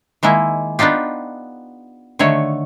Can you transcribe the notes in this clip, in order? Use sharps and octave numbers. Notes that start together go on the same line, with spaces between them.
D#3 G#3 A#3 E4
B3 D4 D#4 F4 G4
D3 D#3 A3 C#5